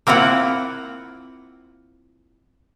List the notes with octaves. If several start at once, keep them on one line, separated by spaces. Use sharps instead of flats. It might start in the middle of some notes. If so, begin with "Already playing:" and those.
A#3 C4 E4 F4 F#5